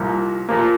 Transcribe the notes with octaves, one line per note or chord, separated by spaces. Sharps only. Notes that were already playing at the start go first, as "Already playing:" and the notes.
Already playing: C2 A#2 F3 A#3
A#2 F3 A#3